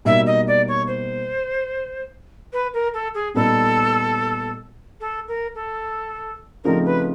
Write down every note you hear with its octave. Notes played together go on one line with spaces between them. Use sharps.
B2 G3 A#3 D#4 E5
D#5
D5
C#5
C5
B4
A#4
A4
G#4
A#2 G3 B3 D#4 A4
A4
A#4
A4
C#3 F3 A3 C4 D#4 A#4
B4